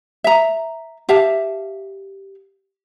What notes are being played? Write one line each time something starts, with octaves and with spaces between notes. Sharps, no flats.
E5 A#5
G4 E5 F5 A5